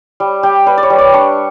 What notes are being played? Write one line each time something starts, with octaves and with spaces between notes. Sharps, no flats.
G3
G3 G4
G3 B4
D5
C#5
G3
D5
D4 C#6